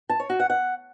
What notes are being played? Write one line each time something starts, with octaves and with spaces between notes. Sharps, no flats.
A5
C#5
F#4
F#5
F#5